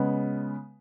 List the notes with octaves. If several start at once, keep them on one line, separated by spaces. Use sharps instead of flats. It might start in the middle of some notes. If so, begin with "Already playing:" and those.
Already playing: C#3 G#3 B3